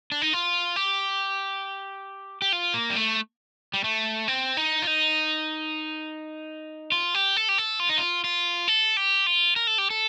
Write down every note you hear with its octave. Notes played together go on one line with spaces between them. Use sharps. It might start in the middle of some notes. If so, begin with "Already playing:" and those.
D4
D#4
F4
G4
G4
F4
A#3
G3
A3
G3
A3
C4
D#4
F4
D#4
F4
G4
A4
G4
A4
F4
D#4
F4
F4
A4
G4
F4
A#4
A4
G4
A4